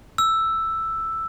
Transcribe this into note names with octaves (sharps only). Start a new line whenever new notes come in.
E6